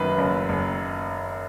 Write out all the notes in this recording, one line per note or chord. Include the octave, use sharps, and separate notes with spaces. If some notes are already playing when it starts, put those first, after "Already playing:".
Already playing: F#1 F#2 D#3 B4
F#1
F#1